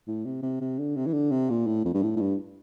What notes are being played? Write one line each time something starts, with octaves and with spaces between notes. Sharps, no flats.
A2
C3
C3
C3
D3
C3
E3
D3
C3
A#2
A2
F2
G2
A2
A2
G2